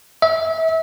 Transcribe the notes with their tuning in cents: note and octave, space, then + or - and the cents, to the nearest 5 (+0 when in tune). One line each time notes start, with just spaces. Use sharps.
E5 -30